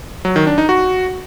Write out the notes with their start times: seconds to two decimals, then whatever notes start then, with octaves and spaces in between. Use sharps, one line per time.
0.25 F#3
0.36 D#3
0.47 D4
0.58 D#4
0.69 F#4